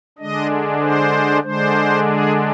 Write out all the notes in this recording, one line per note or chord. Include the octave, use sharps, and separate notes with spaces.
D3 G#3 D4 D#5
C5
D3 G#3 D4 C5
G#4